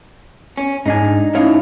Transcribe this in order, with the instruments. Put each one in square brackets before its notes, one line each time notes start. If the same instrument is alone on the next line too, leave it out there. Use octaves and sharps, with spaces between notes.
[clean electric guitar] C#4
[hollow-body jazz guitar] G#2 D4 G#5 [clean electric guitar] D#4
[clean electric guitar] A2 E4 F5 [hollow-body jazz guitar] C#4 D#4 C#5